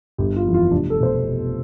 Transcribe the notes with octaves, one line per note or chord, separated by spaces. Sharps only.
G1 G4
F4
F2 E3
F4
F1 D4
A4
B2 C5